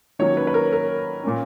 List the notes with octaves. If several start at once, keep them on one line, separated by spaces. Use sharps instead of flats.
D#3 F#3 A#3 C#4 C#5
B4
B4
A#4
A#4
A#2 A#3 C#4